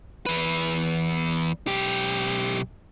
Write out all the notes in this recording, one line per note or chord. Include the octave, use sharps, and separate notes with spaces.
E2 B4
B1 G4